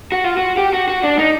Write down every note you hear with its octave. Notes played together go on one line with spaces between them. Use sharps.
F#4
F4
F#4
G4
F#4
F#4
D4
D#4